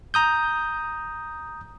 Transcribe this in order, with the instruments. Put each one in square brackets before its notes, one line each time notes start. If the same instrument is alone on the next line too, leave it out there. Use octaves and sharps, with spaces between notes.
[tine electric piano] A#5 D#6 G6